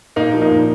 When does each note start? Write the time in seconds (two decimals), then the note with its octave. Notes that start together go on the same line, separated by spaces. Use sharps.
0.16 A#2 A#3 D#4
0.34 F3
0.42 A#3 D#4
0.51 A#2